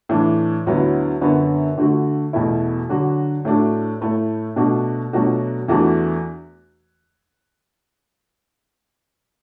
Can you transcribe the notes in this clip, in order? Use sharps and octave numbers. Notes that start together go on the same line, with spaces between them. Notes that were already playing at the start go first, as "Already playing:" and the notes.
A2 E3 D4
D2 D3 F#3 B3 E4
F#2 D3 F#3 B3 F#4
D3 A3 F#4
E2 B2 A3 E4
D3 F#3 D4 F#4
A2 A3 D4 F#4
A2 A3 E4
B2 A3 D4 F#4
B2 F#3 A3 D4 F#4
E2 E3 A3 D4 F#4